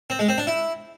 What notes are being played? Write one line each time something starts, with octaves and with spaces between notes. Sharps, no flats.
C4
G#3
C4
D4
E4